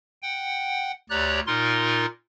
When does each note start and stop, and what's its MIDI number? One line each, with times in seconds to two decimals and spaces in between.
0.23 0.92 78
0.23 0.92 79
1.10 1.40 38
1.10 1.40 67
1.10 1.40 73
1.10 1.40 74
1.10 1.40 82
1.10 1.40 90
1.47 2.06 46
1.47 2.06 63
1.47 2.06 65
1.47 2.06 70
1.47 2.06 84